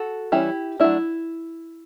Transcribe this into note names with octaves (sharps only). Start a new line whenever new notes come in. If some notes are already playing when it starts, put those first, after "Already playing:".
Already playing: F#4 A4
E3 G3 C#4 E4 G4
F#3 A3 D4 E4